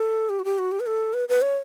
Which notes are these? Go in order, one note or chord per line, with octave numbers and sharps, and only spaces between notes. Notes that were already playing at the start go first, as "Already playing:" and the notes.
Already playing: A4
G4
F#4
G4
F#4
G4
B4
A4
B4
B4
C#5